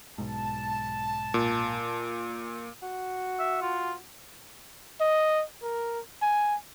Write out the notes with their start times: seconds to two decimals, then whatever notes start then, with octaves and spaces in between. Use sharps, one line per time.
0.18 B1 G#2 A5
1.34 A#2
2.82 F#4
3.39 E5
3.61 F4
5.01 D#5
5.63 A#4
6.22 G#5